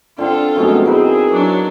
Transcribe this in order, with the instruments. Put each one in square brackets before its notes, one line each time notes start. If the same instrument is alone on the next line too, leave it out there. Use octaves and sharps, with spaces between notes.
[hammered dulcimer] D3 C4 [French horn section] D4 [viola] F4 A4
[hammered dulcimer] F#2 B2 G#3 [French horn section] F3 A3 C4
[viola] C4 [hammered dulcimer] D#4 A#4 B4 [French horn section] E4 G#4
[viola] F#3 D4